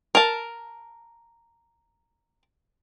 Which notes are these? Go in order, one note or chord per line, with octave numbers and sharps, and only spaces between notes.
A#4 A5